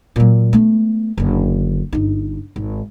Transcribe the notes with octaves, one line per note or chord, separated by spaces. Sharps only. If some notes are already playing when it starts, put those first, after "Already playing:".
A#2 F#3
A3 B3
F#1 D3
G1 D#4
G#1